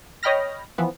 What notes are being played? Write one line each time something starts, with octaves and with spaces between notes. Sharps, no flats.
C#5 D#5 G5 B5 F6 A#6
E3 F3 B3